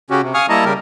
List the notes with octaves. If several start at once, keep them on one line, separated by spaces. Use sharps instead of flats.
C#3 C#4 F#4 G4
C3
F5 G#5 C#6 D#6 F6
G3 A#3 E4 D#5 A5 A#5
C#3 G3 G4 A#4